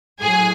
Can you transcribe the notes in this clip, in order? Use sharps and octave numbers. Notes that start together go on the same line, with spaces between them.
A2 F#3 G#4 G#5